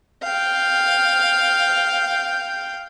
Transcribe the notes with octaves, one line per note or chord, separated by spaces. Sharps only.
F5 G5